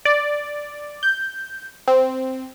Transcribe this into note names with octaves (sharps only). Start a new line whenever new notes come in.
D5
G6
C4